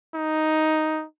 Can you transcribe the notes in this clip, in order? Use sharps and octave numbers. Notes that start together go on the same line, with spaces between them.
D#4